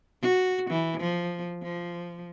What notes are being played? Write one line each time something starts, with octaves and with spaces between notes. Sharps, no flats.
F#4
E3
F3
F3